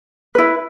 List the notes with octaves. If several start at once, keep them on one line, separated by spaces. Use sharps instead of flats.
E4 B4